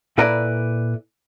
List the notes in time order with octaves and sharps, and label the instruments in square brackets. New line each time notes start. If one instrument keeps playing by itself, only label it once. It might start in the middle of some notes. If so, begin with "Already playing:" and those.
[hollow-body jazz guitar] A#2 E4 A4 B4 D5 A#5